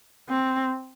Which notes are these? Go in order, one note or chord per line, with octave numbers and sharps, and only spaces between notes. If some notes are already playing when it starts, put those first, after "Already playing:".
C4